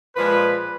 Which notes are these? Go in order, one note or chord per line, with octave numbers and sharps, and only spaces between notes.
A#2 F3 G#3 B4